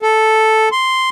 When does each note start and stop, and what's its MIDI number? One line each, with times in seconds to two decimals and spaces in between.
0.02 0.69 69
0.72 1.10 84